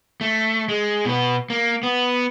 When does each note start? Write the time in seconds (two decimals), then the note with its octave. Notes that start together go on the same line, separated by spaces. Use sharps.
0.21 A3
0.69 G#3
1.05 B2 B3
1.50 A#3
1.83 B3